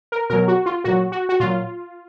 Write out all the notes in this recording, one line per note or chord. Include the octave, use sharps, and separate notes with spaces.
A#4
B2 F#3 A#4
F#4
F4
A#2 F#3 F#4
F#4
F#4
A#2 F#3 F4